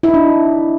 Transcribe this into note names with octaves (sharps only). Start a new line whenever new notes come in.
E4
D#4
D4